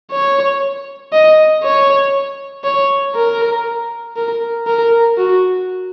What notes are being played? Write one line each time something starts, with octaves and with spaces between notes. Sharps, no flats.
C#5
D#5
C#5
C#5
A#4
A#4
A#4
F#4